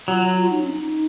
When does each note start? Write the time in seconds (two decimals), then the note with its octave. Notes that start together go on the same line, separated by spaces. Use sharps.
0.08 F#3 F4
0.41 F4
0.50 D#4
0.61 C#4
0.71 D#4